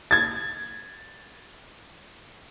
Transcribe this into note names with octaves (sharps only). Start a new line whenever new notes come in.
G#6 A6